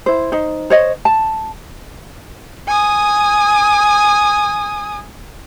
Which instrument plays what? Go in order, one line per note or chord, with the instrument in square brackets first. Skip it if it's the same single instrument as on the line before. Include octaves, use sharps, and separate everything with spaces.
[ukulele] E4 C5
D#4 C5
C5 C#5 D#5
A5
[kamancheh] G#5 D#6